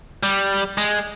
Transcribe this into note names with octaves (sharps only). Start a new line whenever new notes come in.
G3
G#3